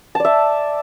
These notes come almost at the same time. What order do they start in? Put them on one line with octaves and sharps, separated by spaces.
A5 D5 E5